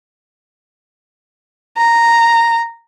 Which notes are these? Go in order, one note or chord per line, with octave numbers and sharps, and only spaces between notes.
A#5